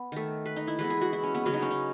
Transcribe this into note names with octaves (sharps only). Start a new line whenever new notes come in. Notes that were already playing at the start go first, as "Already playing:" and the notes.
Already playing: B3
D#3 A3
B4
D#4
E4
E3 G#3 B3 B4
G#4
F#4
E4
C#4
B3
C#3 F#3 B3 C#4
D#4
C#4
D#4